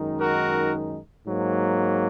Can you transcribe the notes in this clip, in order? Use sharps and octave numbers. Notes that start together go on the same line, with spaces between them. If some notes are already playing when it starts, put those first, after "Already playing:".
Already playing: F#2 D#3 G#3 D#4
F#4 A#4
G#2 F#3 A#3